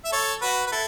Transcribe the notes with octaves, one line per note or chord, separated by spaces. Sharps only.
E5
A4 C#5
F#4 B4
B4
E4 A4